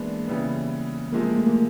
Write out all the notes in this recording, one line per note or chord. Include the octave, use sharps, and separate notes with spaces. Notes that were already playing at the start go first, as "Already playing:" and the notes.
Already playing: E3 G#3 A#3 B3 D4
C#3 E3 G3 B3
C3 F3 G#3 A#3
A3
A#3